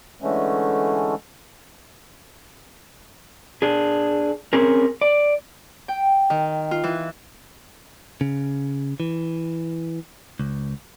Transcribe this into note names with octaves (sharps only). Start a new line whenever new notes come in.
D3 E3 G#3 A3 C#4
D4 G#4
C4 C#4 G#4 A#4
D5
G5
D#3
F4
E3
C#3
E3
C#2